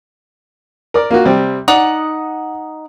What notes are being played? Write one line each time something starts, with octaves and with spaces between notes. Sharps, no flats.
A#4 D5
A#3 F4 F#4
C3 G3 C4
D#4 D5 F#5 D#6